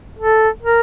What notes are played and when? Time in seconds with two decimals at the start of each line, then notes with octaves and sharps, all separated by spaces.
0.19 A4
0.62 A#4